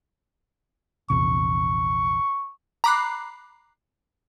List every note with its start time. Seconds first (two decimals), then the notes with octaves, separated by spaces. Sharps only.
1.10 A#1 E2 C3 C#6
2.84 A#5 B5 D6 F#6 C7